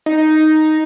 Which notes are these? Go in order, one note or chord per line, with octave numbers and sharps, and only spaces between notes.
D#4